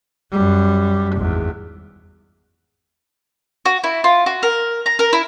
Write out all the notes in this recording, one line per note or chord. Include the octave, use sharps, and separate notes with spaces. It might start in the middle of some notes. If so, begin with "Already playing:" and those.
F#2 G3
G#1 E2
F#4
E4
F4
F#4
A#4
A#5
A#4
E4